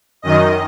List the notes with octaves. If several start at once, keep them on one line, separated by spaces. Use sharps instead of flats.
F#2 D#3 D#5